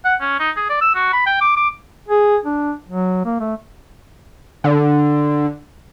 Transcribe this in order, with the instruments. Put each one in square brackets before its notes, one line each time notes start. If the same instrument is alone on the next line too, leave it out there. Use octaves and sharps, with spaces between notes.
[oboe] F#5
C#4
D#4
G#4
D5
E6
F#4
B5
G5
D6
D6
[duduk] G#4
D4
F#3
A#3
A3
[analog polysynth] D3